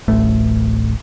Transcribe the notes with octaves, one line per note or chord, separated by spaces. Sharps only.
D1 A1 A3